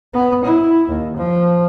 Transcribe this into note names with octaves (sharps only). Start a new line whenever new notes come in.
B3
E4
D#2
F3